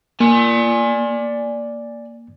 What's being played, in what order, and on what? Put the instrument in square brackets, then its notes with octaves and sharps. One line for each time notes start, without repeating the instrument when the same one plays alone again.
[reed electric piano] A#3 [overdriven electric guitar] D5 G#5